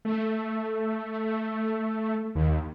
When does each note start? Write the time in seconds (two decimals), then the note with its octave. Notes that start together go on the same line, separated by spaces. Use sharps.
0.05 A3
2.35 D#2